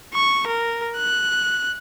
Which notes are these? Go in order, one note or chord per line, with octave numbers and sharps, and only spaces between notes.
C#6
A#4
F#6